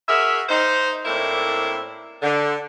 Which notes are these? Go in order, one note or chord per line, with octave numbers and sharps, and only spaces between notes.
F#4 G#4 A#4 E5
D#4 C5
A2 A#3 C4 D4 E4
D3